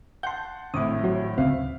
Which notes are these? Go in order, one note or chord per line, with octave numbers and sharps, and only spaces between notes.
F#5 A5 C6 G6
G#1 A2 E4 D6 D#6
F#3 F#4 C#5
D2 C#3 C4 E5 F5